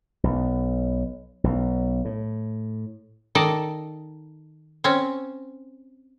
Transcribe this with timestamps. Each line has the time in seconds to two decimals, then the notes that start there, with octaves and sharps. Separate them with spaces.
0.23 B1
1.44 B1
2.05 A2
3.35 D#3 A4 D5 D#5
4.84 C4 C#4